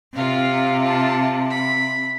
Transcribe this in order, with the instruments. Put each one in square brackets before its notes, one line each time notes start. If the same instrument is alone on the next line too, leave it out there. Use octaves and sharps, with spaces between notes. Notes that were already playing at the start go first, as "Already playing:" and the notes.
[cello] C3 [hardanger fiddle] F4 F5
[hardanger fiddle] F4 A5
B5